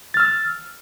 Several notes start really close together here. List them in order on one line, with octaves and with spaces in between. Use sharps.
A6 F6 E6